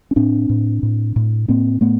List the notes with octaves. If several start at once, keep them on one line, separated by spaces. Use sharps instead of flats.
C#4
A2 C4 D4
A2
A2
A2
A2 A#3 C4
A2 A3 B3